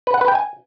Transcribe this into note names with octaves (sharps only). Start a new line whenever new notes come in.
B4
F#5
B4
G5
G#5